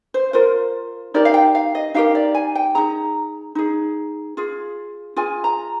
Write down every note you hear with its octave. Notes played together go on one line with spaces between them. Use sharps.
C5
F4 A#4 C5
D#4 G4 A#4 D5
F5
G5
F5
D#5
D#4 G4 A#4 F5
D5
G#5
G5
D#4 G#4 A#5
D#4 G#4
F4 G#4
F4 G#4 G#5
A#5